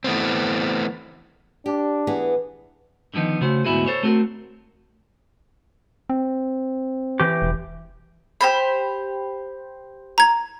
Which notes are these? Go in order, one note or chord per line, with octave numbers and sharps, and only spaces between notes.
E3 A3 B3 C4
D4 G4
E3 B3 G#4
D3 D#3 F3 B3 D#4
C#3 A3 F#4 C5
D2 G#2 B3 E4 F#4 G#4
A4 C5 C#5
A3 C4 F#4 A#4
C4
E3 G4
E1
G4 C5 B5
A#5 G#6